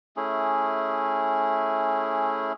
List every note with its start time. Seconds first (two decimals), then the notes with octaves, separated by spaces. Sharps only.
0.17 A3 C#4 E4 G#4